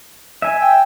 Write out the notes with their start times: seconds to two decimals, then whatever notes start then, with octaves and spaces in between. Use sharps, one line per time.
0.42 E5 G#5
0.61 G5